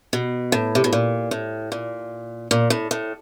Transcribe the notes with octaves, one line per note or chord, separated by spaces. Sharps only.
B2
A2
C3
B2
A#2
A2
A#2
A#2
A2
A2